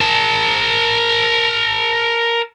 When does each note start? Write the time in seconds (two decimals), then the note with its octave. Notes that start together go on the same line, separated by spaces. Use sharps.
0.01 A#4 A5